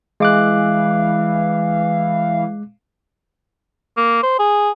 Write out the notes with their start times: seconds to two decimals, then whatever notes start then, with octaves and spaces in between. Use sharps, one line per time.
0.20 E3 G#3 F5 D6 F#6
3.97 A#3
4.23 C5
4.39 G#4